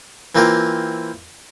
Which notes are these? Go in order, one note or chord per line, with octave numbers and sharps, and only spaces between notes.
E3 A#3 C4 F4 A#4